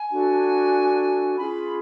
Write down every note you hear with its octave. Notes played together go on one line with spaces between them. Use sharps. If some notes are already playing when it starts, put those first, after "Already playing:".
Already playing: G#5
D4 F#4 A4
C#4 F4 G#4 B5